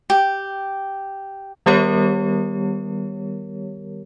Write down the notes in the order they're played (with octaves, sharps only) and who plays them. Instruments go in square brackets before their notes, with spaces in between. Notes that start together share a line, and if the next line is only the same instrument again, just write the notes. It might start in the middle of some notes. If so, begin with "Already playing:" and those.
[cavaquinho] G4
[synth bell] D#3 G3 B3 G4 A#4 C#5